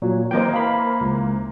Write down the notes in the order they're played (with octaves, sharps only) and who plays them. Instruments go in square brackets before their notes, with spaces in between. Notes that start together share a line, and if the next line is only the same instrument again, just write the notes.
[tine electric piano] A#2 F#3
[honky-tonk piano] E3 A#3 C5 [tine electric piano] D#5 G5
[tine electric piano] F5 B5
C#2